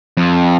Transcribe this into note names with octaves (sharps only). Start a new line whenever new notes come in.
F2